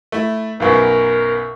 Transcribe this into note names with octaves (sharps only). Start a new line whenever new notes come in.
A3 E4
B1 F#2 B2 A#4